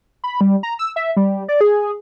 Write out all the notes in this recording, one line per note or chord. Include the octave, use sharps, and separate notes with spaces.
B5
G3
A#5
E6
E5
G3
D5
G#4